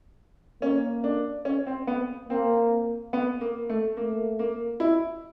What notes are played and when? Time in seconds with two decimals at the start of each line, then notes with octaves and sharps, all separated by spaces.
0.62 A#3 C#4
1.04 D4
1.45 C#4
1.67 C4
1.87 B3
2.29 A#3 C4
3.13 B3
3.41 A#3
3.69 A3
3.97 A3 A#3
4.39 A#3
4.80 E4